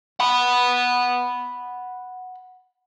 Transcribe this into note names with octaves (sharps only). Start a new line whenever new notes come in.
F#5 B5